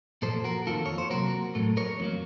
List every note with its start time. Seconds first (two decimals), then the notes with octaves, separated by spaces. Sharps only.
0.22 A#2 F3 A#3 A4 C5
0.44 F#4 A#4
0.67 F2 D#3 A#3 F4 A4
0.86 C#5
0.98 C5
1.10 C3 F#3 A#3 F#4 A#4
1.55 A2 F#3 A3
1.77 A#4 C#5
1.99 F2 D#3 F#3 A#3